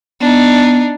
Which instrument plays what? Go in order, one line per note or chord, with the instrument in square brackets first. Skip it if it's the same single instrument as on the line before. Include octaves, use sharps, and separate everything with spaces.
[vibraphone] B3 [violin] D4 D#4